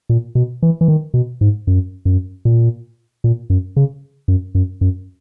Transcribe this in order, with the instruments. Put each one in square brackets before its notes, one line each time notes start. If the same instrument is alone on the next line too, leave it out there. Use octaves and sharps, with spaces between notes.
[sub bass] A#2
B2
E3
E3
D#3
B2
G#2
F#2
F#2
A#2
A#2
F#2
C#3
F#2
F#2
F#2